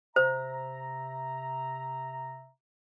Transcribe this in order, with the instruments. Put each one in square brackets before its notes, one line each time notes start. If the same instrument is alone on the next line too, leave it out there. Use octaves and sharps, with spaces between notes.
[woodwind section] C3 E5 A#5 [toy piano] C5